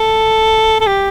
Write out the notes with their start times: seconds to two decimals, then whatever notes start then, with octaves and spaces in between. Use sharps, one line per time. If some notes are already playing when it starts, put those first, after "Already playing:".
Already playing: A4
0.80 A4
0.87 G4